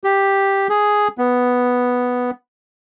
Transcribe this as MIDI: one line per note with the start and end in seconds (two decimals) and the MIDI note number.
0.04 0.68 67
0.70 1.08 68
1.18 2.31 59